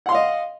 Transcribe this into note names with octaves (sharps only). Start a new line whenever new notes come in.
D#5 F5 F#5 C6